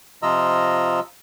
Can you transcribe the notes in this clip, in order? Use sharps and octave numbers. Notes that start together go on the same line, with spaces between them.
C3 F3 F4 D#5 A#5 E6